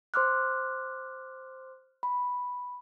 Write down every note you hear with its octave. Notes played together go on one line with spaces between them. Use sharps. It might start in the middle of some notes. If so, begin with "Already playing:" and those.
C5 C6 D6 F6 F#6
B5